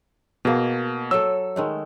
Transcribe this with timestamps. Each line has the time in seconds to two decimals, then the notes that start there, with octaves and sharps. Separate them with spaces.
0.45 B2 A#3 G#4
1.11 F#3 A4 E6
1.56 D#3 G#3 A3